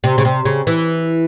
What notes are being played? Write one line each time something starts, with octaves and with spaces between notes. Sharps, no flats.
C3
C#3
C3
C#3
E3